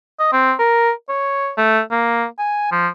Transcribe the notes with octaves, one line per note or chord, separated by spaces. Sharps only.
D#5
C4
A#4
C#5
A3
A#3
G#5
F3